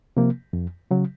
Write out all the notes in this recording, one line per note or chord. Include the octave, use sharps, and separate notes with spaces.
C3 F3 A#3
F2
C#3 F#3